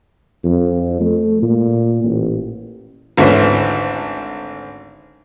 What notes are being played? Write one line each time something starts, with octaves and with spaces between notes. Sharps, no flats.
F2
A3
A#2
A1
G#1 D2 E3 A3 C#4 C5